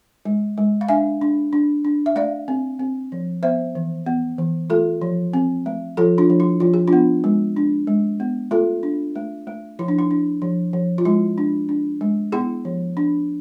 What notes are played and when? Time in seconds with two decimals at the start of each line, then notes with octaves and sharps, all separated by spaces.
0.25 G#3
0.58 G#3
0.81 F5
0.89 D4 E5 G#5
1.21 D4
1.53 D4
1.85 D4
2.06 E5
2.16 A3 D5 F5
2.48 C4
2.79 C4
3.12 F3
3.43 B3 C5 E5
3.75 E3
4.06 B3
4.38 E3
4.70 A3 F4 A4
5.01 F3
5.33 C4
5.66 A3
5.97 F3 F4 A4
6.18 D4 F4
6.30 F3
6.40 E4
6.60 F3 F4
6.74 G#4
6.88 D4 F4
6.93 B3
7.24 G#3
7.57 D4
7.87 G#3
8.20 B3
8.51 A3 F4 A4
8.83 D4
9.15 A3
9.47 A3
9.79 F3 E4
9.88 D4
9.99 E4
10.11 D4
10.42 F3
10.73 F3
10.98 F4
11.05 G#3 E4
11.38 D4
11.69 D4
12.01 G#3
12.32 B3 E4 G#4
12.65 F3
12.97 D4